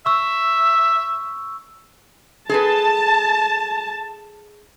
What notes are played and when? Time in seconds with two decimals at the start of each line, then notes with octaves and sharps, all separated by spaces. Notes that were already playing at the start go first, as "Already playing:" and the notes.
0.06 E5 C#6 E6
2.49 G#4 A4 B4 A5